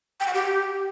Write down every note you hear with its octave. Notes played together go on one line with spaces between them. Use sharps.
G5
F#5
G4